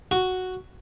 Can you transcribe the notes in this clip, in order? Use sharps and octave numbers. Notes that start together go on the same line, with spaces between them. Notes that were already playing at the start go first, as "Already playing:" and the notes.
F#4